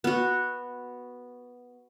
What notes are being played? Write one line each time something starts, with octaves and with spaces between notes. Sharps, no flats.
B3 F#4